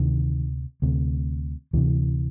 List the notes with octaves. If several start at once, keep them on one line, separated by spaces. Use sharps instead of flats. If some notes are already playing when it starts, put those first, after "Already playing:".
Already playing: D2 C3 D#3
D2 C3
D2 C3 E3